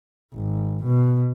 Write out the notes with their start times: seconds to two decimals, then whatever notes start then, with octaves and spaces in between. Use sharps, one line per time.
0.35 G#1
0.84 B2